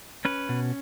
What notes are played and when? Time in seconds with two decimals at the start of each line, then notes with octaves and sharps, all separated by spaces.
0.25 C#4 B4
0.49 B2